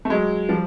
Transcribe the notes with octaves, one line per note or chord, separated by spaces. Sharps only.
A3
F#3 G#3
F3 G3